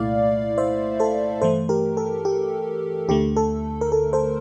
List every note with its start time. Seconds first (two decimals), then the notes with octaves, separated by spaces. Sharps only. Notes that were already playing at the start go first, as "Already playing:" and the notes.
Already playing: C2 A#2 A3 E4 D5 F5
0.58 C5 E5
1.00 A4 C5
1.41 G2 E3 A3 A4 C5
1.69 G4 A#4
1.97 A4
2.25 G4
3.08 D2 D3 A3 G4
3.36 A4
3.81 A#4
3.92 A4
4.13 A4 C5